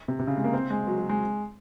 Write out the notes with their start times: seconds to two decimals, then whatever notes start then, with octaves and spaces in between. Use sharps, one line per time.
0.08 C3
0.19 C3
0.27 C#3
0.37 G#3
0.44 A#3
0.53 C4
0.70 G#3
0.87 F#3
0.98 F#3
1.09 G#3